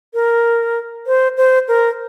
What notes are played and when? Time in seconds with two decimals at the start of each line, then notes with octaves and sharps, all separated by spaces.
0.14 A#4
1.07 C5
1.37 C5
1.68 A#4